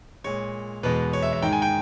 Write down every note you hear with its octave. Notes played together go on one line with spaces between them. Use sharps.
A#2 G#3 C#5
E2 B2 G#3 B4
C#5
E5
E5
G#2 D#3 G#3 G5
G#5
G5